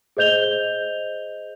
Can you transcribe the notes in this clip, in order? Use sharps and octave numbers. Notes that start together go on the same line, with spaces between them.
G#4 C5 D#5 G6 F7 G7